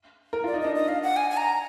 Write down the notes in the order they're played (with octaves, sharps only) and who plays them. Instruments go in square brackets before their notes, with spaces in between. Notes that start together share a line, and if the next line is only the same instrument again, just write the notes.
[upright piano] A#4
[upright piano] F4 [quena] D5
[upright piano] D#4
[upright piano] D4 [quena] D#5
[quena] D#5
F5
F#5
G#5
G#5
A#5